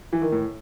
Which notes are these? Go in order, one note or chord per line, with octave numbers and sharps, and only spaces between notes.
E3
D#3
A2